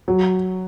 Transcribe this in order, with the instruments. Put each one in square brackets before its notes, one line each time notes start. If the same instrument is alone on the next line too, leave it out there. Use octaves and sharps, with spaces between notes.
[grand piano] F#3